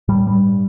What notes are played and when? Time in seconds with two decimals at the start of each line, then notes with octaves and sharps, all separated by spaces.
0.08 A2 G3
0.27 G2 G3